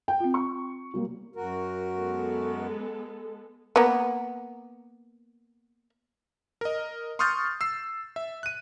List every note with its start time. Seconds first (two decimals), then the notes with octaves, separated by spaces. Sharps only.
0.08 G5
0.20 C4 F4
0.34 C#6
0.94 F#3 G3 A#3
1.36 F#2 F#4 A#4
1.96 G#3 B3 A4
3.76 A#3 B3
6.61 A#4 D#5
7.19 C6 C#6 D#6 F6 G6 A6
7.61 E6 C7
8.16 E5
8.43 F#6 D#7